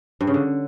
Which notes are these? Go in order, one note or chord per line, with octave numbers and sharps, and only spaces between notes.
G2
C#3
D3